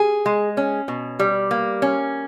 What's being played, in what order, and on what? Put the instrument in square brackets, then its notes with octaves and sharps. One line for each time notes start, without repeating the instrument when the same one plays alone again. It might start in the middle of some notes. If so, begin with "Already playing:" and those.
Already playing: [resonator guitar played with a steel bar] G#4
G#3
C#4
B2
G3
A#3
C#4